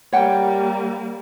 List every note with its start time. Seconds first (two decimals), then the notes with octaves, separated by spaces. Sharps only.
0.12 G3 A#3 C#5 F#5 G5